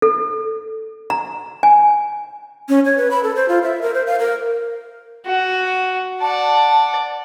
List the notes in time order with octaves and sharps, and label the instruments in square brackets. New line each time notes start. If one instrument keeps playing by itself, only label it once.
[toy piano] A4
A#5
G#5
[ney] C#4
C#5
B4
B5
A4
C5
F4
E5
A#4
C5
F5
A#4
[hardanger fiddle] F#4
[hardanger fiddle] D5 F#5 [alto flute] A5